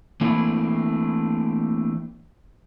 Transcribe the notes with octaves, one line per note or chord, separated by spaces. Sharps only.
E3 A3 A#3 C4 D4 E4